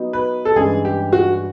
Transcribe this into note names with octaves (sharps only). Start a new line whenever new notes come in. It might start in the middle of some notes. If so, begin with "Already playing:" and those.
Already playing: F#3 B3 D#4
B4
A4
G2 E3 G#3 C#4 G#4
G4
F#4